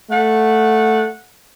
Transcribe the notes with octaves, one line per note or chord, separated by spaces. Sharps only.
A3 F#5